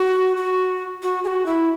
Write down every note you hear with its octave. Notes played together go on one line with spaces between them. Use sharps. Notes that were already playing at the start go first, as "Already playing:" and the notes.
Already playing: F#4
F#4
F#4
G#4
F#4
E4